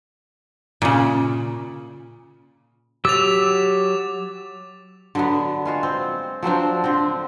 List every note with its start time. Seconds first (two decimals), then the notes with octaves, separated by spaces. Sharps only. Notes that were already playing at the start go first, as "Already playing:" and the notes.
0.82 A#2 C#3
3.05 F#3 G4 D6 E6 A6 F7
5.15 D3 F#3 B3
5.65 G#3 F4 F#4
5.83 C4
6.43 F3 F#3 C4 D4
6.84 D3 C4